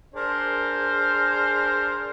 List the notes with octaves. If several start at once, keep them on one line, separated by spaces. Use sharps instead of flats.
D4 G#4 A#4 C5